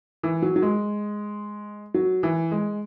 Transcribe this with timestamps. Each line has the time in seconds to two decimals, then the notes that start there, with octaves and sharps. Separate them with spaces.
0.23 E3
0.42 F#3
0.56 F#3
0.62 G#3
1.94 F#3
2.23 E3
2.51 G#3